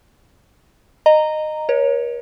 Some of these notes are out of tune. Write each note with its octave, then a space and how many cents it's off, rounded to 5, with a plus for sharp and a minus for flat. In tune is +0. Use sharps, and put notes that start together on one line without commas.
D#5 -15 A#5 -5
A#4 +45 C#5 +0